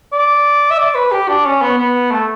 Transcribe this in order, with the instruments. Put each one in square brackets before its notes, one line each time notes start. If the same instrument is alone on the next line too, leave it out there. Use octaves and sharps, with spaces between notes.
[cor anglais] D5
E5
D5
B4
G4
D4
C#4
B3
B3
A3